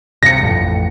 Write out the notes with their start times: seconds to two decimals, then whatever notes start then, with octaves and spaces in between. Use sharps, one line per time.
0.23 G2 C3 A#6 C#7
0.42 A1 F2 A2